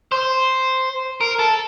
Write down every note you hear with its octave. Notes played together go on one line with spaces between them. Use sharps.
C5
A#4
A4